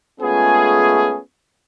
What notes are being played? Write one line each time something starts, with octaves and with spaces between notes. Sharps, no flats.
G#3 A3 B3 C#4 F4 G#4